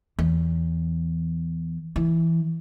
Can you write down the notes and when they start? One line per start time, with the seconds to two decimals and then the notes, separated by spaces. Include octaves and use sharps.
0.19 E2
1.96 E3